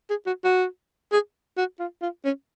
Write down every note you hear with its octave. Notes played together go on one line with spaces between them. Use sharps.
G#4
F#4
F#4
G#4
F#4
F4
F4
C#4